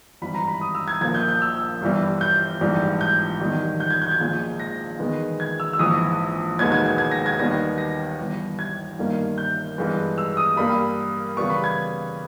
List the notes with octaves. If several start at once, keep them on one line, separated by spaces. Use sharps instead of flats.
G#1 G2 E3 B5
A#5
B5
D#6
E6
G#6
A#1 A#2 A#3 G#6
G6
G6
E6
G1 G2 E3 G3
G6
A#1 G#2 E3 G3
G6
E1 E2 D#3 G3
G6
G#6
G6
G#6
A#1 A#2 G#3 G6
A#6
E2 D#3 G#3 B3
G#6
E6
E6
A#1 G#2 E3 D#6
E1 D#2 D#3 G#3 B3 G#6
G#6
G#6
G#6
A#6
G#6
D#2 D#3 G3 B3 A#6
A#6
G1 G2 E3
G#6
G1 G2 D#3 A#3
G6
G2 E3 G#3 B3
E6
D#6
G2 G3 A#3 B5
E2 C#3 G3 B3 C#6
B5
G#6